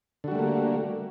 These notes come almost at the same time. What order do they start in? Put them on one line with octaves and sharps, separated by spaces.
D3 F#4 G3 A3 A#3